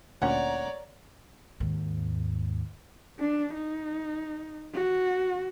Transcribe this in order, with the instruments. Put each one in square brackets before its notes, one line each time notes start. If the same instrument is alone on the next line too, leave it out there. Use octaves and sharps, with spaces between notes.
[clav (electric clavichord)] D2 A#2 C#4 [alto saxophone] C#5 [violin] D5 A#5 [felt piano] F#5
[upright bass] D#2 G#2
[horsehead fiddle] D4
D#4
F#4